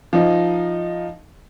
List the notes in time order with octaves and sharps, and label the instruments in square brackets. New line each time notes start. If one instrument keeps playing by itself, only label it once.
[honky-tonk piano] F3 D#4